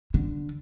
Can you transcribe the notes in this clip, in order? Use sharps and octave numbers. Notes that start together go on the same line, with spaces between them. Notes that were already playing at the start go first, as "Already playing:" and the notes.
D3